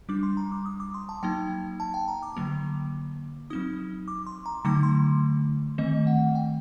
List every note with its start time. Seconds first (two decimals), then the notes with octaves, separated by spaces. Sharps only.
0.09 G3 D4 D6
0.23 C6
0.37 A#5
0.52 D6
0.66 D#6
0.80 D6
0.94 C6
1.09 A5
1.23 F#3 A#3 D#4 G5
1.80 A5
1.94 G5
2.08 A#5
2.23 D6
2.37 D3 F#3 A#3
3.50 F#3 C4 D#4 D#6
4.08 D6
4.27 C6
4.46 A#5
4.65 D3 F#3 A3 D#4 D6
4.83 C6
5.78 D#3 A3 C4 D#5
6.07 F#5
6.35 G5